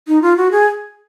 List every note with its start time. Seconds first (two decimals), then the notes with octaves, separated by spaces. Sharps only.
0.08 D#4
0.22 F4
0.37 F#4
0.51 G#4